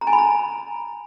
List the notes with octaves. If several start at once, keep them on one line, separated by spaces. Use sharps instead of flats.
A#5
G#5
B5
A#5